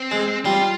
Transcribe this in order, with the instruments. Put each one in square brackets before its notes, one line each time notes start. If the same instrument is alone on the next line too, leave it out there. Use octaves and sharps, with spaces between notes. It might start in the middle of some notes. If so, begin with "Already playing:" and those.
Already playing: [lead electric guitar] C4
[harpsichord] G#3
[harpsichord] G3 [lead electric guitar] F4